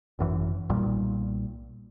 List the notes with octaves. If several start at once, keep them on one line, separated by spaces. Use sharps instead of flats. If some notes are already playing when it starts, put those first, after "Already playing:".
G#1 F#2 E3
B1 A#2 G3